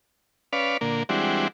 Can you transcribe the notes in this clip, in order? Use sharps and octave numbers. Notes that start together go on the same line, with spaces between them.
C#4 B4 D5 F5
A#2 D3 A#3
E3 G3 G#3 C4 D4 F#4